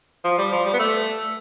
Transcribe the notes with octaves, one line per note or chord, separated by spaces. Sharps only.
F3
G3
F3
G3
B3
A3